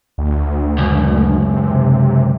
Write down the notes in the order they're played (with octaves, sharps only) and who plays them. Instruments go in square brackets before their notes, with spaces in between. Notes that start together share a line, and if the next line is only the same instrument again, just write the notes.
[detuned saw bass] D2
[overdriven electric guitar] C#2 F#2
[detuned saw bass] C3